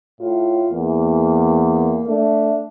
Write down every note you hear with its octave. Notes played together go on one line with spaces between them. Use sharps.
A2 F4
E2 A#3
A3 D4